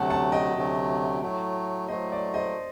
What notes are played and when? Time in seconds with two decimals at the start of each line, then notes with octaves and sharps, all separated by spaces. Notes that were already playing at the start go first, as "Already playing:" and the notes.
Already playing: D2 C3 F#3 A3 F#5 A5
0.10 F#5 A5
0.32 D#5 G5
0.55 D2 C3 F#3 A3
1.22 A2 F#3 A3
1.88 A2 F#3 A3 C5 D#5
2.12 D5
2.34 C5 D#5